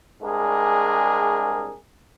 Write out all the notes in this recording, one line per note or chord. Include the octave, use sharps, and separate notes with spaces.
C2 G#3 D4 G#4 A#4